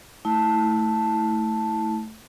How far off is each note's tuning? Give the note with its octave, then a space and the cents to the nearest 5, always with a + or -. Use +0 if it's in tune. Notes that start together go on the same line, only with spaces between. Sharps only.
A3 +0 E4 -30 A5 +0